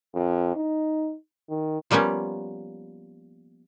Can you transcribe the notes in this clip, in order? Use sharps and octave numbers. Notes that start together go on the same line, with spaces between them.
F2
D#4
D#3
F3 G3 A#3 B3 C#4